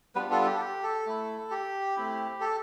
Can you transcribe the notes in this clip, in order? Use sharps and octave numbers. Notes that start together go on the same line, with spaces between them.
G3 B3 D4 F4 B4
A4
A4
G4
A4
G4
A4
A3 E4
G4
A3 C4 E4
A4